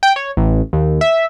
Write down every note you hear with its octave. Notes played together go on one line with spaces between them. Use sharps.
G5
C#5
A1
D#2
E5